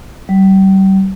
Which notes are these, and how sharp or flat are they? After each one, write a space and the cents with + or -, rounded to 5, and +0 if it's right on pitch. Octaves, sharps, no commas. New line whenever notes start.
G3 -35